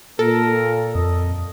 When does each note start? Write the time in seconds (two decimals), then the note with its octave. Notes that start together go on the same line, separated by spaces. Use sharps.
0.19 A#2 A4 A#4
0.95 F2 D#5